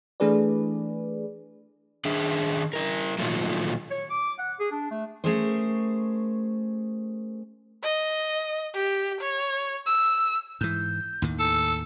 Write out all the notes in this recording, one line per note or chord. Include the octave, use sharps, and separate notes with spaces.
E3 A3 D4 G#4 B4 D5
D#3 D4 G#4 E5
E4 A#4
A#2 D#3 F3 F#3 A3
C#5
D6
F#5
G#4
D4
A3
A3 C#4 G#4 A#4 C5
D#5
G4
C#5
E6
G#2 E3 G6
D#2 A2 D#3
A4 E6